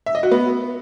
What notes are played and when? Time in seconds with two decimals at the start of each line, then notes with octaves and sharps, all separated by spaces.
0.06 E5
0.15 D#5
0.23 F#4
0.31 B3